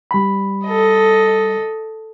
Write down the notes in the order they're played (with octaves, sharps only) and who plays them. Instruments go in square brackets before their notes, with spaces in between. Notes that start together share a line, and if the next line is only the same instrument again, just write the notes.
[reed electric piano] G3 B5
[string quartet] A4 D#5